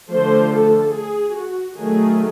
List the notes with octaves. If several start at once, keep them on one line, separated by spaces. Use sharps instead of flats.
D3 F3 A3 C5
A4
G#4
F#4
D#3 F#3 A3 G#4